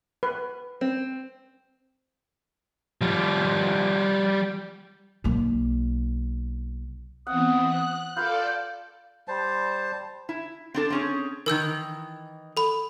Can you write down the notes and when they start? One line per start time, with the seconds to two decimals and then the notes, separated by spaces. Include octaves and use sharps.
0.23 B4
0.81 C4
3.01 F3 G3
5.24 B1 A#3
7.27 E3 B3 C4 F#5 D#6
7.66 F#6
8.16 F4 A4 B4 D5 F5 G6
9.28 G3 C5 A5
10.29 E4
10.74 C4 D4 A4
10.90 C4 C#4 G#4
11.46 D#3 E3 A#4 E6 G6
12.57 A4 B5